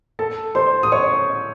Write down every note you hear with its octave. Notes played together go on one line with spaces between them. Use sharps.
A4 A5
C5 C6
D#6
C#5 C#6